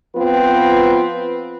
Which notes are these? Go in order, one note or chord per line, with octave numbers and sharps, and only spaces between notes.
F3 B3 C4 F4 B4